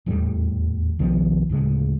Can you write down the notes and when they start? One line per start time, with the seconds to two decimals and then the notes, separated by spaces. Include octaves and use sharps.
0.06 D#1 E2 A2 G3
0.99 B1 D#3 F3 B3
1.49 D1 A2 C#3 G#3